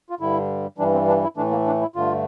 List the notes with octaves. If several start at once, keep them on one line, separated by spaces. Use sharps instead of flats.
F4
G2 D3 G3 E4
G2 E3 G3 D4
C4
D4
E4
A2 E3 A3 D4
A#3
D4
E4
G2 D3 A3 F4